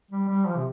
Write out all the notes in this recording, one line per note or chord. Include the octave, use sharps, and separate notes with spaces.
G3
G3
F3
C3